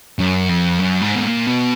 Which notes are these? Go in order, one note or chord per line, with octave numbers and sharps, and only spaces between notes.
F#2
F2
F#2
G#2
B2
A#2
B2